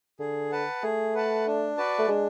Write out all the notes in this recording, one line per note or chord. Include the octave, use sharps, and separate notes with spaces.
D3 G#4
B4 F#5 A5
A3 G#4
B4 F#5 A5
D4
F#4 B4 D5 A5
A3
G#3 D4